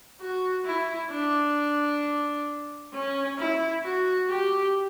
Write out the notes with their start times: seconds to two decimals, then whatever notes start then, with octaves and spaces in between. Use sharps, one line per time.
0.21 F#4
0.65 E4
1.11 D4
2.93 C#4
3.38 E4
3.84 F#4
4.29 G4